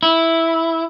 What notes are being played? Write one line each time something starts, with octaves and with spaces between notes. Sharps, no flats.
E4